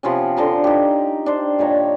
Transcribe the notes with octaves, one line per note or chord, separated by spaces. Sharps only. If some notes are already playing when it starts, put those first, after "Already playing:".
C3 F3 B3 C#4
D3 F3 A#5 C6
D#4 G4
D4 C5
A#2 D#3 C#5 A#5